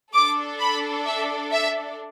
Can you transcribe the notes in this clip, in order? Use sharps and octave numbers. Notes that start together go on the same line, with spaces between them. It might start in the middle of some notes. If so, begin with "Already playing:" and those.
D4 A4 D6
B5
E5
E5